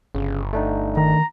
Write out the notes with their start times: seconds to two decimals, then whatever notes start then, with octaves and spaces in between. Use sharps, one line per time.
0.15 G1 C#3
0.53 A3 D4 D#4
0.97 D#3 A#5